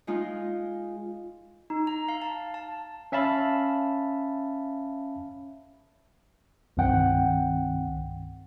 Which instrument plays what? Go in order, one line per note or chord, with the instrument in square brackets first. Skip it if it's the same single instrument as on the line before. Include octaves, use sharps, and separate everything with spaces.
[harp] G#3 D#4 F4
[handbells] D#4
A#5
F5
A5
A5
[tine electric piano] C#4 E5 F5 A5 B5
[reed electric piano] C2 G2 D#3 C4 F#5 G5